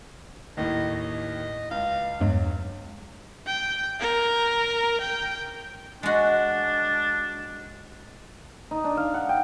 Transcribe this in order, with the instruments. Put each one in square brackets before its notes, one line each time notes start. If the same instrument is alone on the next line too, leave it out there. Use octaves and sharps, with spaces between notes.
[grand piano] D#2 A2 [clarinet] D#5
[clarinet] D#5
[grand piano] C#2 [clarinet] F5
[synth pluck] E2 G2 G#3 [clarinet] F#3
[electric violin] G5
A#4
G5
[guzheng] G#3 F#4 [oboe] D4
[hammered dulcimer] D#4
D4
F5
F#5
G5